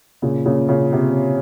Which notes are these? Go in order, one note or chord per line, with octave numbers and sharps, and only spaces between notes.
A#2 C#3
A#2 C#3
A#2 C#3
C3